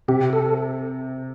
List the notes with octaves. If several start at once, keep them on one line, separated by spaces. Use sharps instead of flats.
C3 G4
A4